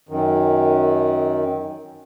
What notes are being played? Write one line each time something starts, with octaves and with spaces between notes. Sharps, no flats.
F#2 D#3